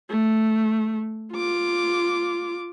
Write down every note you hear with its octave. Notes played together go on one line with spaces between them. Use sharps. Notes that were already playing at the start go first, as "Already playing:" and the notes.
A3
F4 D6